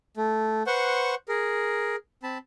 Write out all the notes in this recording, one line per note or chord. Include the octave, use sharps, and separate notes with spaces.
A3
B4 C5 F#5 C6 C#6
G#4 A#4
C4 A5 B5